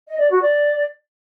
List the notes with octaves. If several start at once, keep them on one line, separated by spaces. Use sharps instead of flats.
D#5
D5
F#4
D5